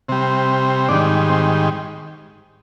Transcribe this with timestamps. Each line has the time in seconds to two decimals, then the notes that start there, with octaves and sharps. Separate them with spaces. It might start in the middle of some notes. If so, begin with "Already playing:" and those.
0.09 C3 G3
0.88 G#2 D#3 G3 D4
1.29 C4